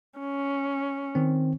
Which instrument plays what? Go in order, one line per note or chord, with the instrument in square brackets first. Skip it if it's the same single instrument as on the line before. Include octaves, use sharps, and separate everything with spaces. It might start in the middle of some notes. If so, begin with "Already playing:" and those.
[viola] C#4
[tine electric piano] D#3 C4